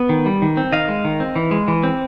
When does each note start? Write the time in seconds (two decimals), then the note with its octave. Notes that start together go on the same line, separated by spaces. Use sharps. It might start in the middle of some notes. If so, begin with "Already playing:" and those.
Already playing: B3
0.09 D#3
0.26 G3
0.42 D#3
0.57 C4
0.72 D#3 D#5 F5
0.88 G#3
1.05 D#3
1.20 C4
1.36 E3
1.51 G#3
1.68 E3
1.83 C4